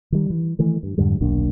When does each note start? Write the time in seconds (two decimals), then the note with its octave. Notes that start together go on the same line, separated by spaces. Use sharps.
0.12 D#3 G3
0.30 E3
0.59 D#3 E3 A3
0.83 G2
0.98 F2 G#2 D3 G3
1.20 D#1 B1 A#3 D4